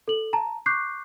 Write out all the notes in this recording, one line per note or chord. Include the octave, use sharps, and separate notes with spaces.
A4 F#7
A5 A#5
C#6 D6 F#6 G6 C7